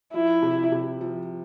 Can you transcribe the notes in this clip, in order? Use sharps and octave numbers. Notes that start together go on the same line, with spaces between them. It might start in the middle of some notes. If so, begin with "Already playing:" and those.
F3 E4
C3
C3
F3